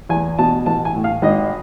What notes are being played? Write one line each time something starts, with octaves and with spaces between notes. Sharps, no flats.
E2 G#5
B2 A5
A1 A5
G#5
A2
F5
G#1 D#5